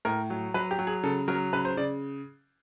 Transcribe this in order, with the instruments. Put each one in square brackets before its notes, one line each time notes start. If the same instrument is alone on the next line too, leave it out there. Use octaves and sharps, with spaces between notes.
[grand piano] A2 A#4
F#3
F#3 B4
G4
F#3
G#4
C#3 A4
F#3 A#4
C#3 B4
C5
C#3 D5